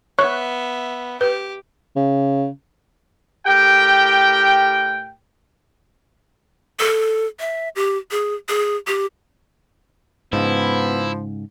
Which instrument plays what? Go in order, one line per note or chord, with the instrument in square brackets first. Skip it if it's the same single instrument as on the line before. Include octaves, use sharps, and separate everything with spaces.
[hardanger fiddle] B3 E5 [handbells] C#5 C#6 F#6
[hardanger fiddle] G4 [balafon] B4
[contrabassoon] C#3
[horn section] A2 G4 A#4 G5
[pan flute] A4
E5
G4
G#4
G#4
G4
[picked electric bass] G#2 C#3 [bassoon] F3 [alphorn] B3 [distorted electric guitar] E4